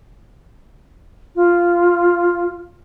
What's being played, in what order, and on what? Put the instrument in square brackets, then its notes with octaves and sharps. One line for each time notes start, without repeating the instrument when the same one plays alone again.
[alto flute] F4